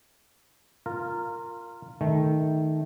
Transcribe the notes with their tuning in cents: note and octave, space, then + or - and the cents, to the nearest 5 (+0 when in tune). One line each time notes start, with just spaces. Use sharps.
F4 +0 A#4 -15
D#3 +0 A3 -15